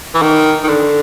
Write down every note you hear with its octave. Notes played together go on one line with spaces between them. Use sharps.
E3
D#3
D#3
D3